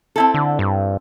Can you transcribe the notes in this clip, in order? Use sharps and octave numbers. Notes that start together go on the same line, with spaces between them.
C4 E4 A4
D3
G2